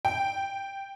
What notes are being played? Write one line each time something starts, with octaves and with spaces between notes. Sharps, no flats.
G5